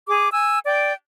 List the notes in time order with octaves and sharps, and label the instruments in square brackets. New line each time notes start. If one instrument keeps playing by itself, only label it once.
[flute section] G#4 D6
G#5 E6
D5 G5